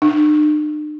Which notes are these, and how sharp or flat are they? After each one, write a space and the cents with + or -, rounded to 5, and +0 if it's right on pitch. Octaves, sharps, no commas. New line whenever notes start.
D4 +45